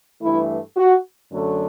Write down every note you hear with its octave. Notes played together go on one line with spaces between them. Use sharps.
G2 E3 A3 E4
F#4
F#2 D3 F#3 A3